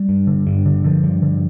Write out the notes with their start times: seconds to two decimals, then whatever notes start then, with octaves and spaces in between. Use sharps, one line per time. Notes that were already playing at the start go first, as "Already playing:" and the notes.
Already playing: G3
0.09 G2
0.27 D3
0.47 G2
0.66 D3
0.84 D3 F3
1.04 G2
1.22 D3